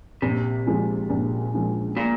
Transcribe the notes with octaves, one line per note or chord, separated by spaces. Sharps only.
A#1 C3
A#2 F3 G#3
A#1
A#2 F3 G#3
A#2